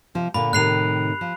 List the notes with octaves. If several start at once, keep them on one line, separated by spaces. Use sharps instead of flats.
C3 F3
A#2 D3 B5
A2 C3 D#3 F#6 C7 F7
F3